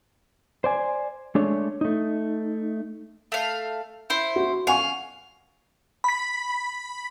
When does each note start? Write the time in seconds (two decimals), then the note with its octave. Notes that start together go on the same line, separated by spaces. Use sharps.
0.64 C5 D5 G#5
1.35 G#3 A3 D4 C#5
1.81 A3 D#4
3.32 A3 F5
4.10 E4 C5
4.36 F#4
4.67 F5 F#5 G#5 C#6
6.04 B5 B6